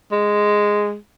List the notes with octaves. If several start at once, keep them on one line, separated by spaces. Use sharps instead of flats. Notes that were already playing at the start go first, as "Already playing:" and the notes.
G#3